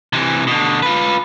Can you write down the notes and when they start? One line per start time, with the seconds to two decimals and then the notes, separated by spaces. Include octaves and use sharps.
0.13 C3 E3
0.47 B2 D3
0.82 F4 B4